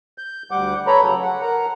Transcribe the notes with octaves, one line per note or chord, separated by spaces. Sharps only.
G6
D2 G3 F#5 D6 G6
A4 B4 C#5 A#5 B5
C#3 F#3 A4
F#5
A#4 F#5 A#5